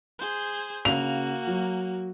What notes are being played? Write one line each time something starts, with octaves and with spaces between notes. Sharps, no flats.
G#4 C5
C#3 A#3 F#4 F7
F#3